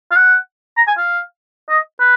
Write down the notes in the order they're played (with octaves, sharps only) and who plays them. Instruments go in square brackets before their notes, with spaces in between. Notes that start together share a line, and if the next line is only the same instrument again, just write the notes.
[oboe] F5
F#5
A#5
G#5
F5
D#5
B4